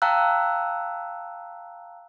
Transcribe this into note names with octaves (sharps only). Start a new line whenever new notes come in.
F5 G5 A5 A#5 E6 F#6